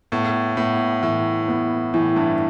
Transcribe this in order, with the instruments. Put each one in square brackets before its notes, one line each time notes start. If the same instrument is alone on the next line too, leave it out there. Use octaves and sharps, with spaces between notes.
[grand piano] A2 [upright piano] B3
[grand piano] A2 [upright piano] B3
[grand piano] A2 [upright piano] E3
[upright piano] B3
[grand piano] A2 [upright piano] E3
[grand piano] G2